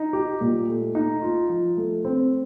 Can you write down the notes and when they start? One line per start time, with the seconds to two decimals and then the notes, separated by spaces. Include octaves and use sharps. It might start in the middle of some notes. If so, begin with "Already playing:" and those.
Already playing: D#4
0.13 G4
0.41 A#2
0.68 A3
0.95 D#4
1.22 F4
1.49 F3
1.77 A3
2.05 C4